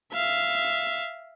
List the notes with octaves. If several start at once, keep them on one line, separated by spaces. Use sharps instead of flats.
E5 F5